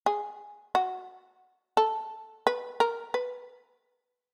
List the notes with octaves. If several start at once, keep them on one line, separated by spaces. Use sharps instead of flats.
G#4
F#4
A4
B4
A#4
B4